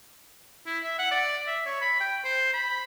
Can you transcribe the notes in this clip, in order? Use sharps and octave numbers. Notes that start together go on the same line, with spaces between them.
E4
E5
F#5
D5
E5
C#5
B5
G5
C5
B5